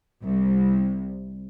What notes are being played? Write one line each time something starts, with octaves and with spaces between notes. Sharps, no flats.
C2